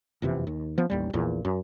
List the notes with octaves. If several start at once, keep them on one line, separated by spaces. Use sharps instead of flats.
F#1 F2 C3 E3
D#2
F3 B3
A1 D#2 G3
A#1 E2 A#2
F#2